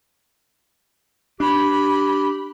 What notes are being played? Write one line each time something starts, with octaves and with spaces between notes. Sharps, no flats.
D4 G4 B5